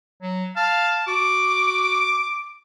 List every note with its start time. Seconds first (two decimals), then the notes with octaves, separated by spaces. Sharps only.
0.22 F#3
0.56 F5 A5
1.07 F#4 D6